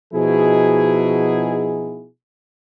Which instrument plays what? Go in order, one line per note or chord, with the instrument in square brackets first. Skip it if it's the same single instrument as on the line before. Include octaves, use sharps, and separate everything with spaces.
[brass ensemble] B2 F3 D#4 E4 F#4 G#4